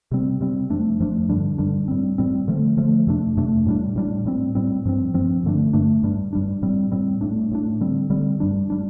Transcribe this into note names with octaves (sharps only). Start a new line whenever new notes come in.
C3 G3 C4
C3 G3 C4
F2 F3 A3 D4
F2 F3 A3 D4
G2 D3 G3 D4
G2 D3 G3 D4
A2 G3 C4
A2 G3 C4
D3 F3 A3
D3 F3 A3
F2 C3 A3 D4
F2 C3 A3 D4
A2 G3 D4
A2 G3 D4
A2 G3 C4
A2 G3 C4
G2 F3 C4
G2 F3 C4
G2 D3 A3 D4
G2 D3 A3 D4
G2 G3 D4
G2 G3 D4
A2 G3 C4
A2 G3 C4
A2 A3 D4
A2 A3 D4
D3 G3 C4
D3 G3 C4
G2 G3 D4
G3 D4